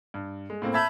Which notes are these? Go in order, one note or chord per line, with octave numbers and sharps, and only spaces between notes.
G2
G#3
A2 A#3 C4
E5 A5 B5 E6 G6 G#6